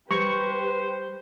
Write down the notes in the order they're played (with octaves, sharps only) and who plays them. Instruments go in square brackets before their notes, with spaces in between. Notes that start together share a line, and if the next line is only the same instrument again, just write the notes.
[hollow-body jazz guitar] G3 [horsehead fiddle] G4 B4 [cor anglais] C5 [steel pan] C#6